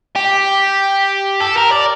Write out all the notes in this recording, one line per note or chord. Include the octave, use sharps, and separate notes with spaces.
G4
A4
A#4
D5